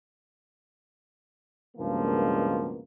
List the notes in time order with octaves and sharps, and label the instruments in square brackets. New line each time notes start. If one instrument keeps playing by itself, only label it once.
[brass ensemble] C#2 G2 B2 F3 G#3 A#3